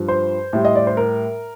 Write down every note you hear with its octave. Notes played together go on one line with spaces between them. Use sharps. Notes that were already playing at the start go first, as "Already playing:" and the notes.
Already playing: G2 F3
C5
A2 G3
D#5
D5
C5
A#4